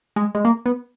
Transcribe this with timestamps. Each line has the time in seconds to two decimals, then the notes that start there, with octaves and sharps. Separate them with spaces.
0.16 G#3
0.35 G#3
0.45 A#3
0.66 B3